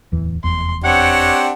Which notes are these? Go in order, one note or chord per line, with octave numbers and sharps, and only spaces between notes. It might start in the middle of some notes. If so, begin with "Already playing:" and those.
D1 E2 E3
F1 E2 C6
C4 D4 G4 C#5 F#5